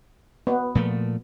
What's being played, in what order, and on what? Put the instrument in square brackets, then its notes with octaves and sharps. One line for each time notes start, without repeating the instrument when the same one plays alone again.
[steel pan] B3
[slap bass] A#2 F3 A3